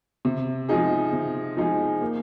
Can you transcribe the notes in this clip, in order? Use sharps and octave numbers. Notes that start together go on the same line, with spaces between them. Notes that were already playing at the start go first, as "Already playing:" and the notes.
C3
F3 G#3 D#4 G#4
C3
F3 G#3 D#4 G#4
A#3